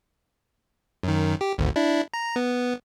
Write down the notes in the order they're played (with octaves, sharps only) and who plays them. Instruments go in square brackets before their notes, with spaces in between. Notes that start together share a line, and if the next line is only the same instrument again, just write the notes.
[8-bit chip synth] F#2 D#3
G4
G#1 D2
D4 E4
A#5
B3